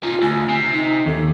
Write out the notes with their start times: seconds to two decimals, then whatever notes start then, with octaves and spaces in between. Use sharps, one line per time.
0.03 C#4 D#4 F4
0.22 D2 G#5
0.49 C3
0.73 D#4
1.06 D#2 A4